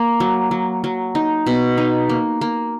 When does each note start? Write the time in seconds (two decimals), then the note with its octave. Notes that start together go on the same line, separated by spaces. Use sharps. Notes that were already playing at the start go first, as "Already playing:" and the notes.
Already playing: A#3
0.20 F#3
0.51 F#3
0.84 F#3
1.15 D#4
1.46 B2
1.78 D#4
2.09 A#3
2.41 A#3